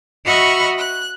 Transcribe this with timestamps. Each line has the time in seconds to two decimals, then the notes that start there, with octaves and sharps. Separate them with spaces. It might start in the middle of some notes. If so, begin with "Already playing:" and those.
0.25 F#4 D#5 E5 B5 C#6 F6
0.77 F#6